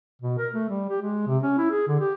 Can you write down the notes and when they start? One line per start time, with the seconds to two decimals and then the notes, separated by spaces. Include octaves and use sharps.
0.22 B2
0.38 A#4
0.54 A3
0.69 G3
0.89 G4
1.01 G#3
1.27 C3
1.43 C#4
1.58 E4
1.71 G#4
1.88 D3
2.00 G4